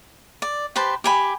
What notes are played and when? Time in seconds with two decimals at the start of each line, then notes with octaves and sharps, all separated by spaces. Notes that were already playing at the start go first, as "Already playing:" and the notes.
0.42 D5
0.76 G4 B4 C5 A5
1.04 G4 G#5 B5